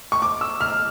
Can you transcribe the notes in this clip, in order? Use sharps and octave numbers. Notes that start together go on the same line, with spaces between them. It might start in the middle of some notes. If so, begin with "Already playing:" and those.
C#6
D6
E6
F6